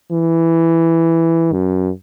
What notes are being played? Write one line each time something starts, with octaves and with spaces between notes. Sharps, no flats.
E3
F#2